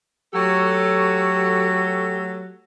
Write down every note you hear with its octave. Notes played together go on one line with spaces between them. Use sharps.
F#3 A3 F#4 G4 A4